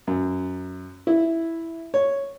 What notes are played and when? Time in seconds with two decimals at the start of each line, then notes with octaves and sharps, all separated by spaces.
0.07 F#2
1.07 E4
1.94 C#5